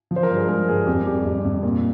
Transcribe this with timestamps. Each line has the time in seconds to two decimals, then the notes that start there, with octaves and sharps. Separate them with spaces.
0.11 F3
0.16 C5
0.23 A#4
0.30 G2
0.36 G#4
0.49 G#3 A#4
0.68 G2 G#4
0.87 F2 G4
1.06 G3 G4
1.25 F2
1.45 F2
1.63 A#2